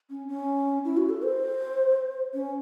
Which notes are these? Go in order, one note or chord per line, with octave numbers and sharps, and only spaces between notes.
C#4
C#4
E4
F#4
A4
C5
C#4